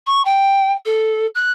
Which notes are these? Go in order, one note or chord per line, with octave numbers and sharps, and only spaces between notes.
C#6
G5
A4
F#6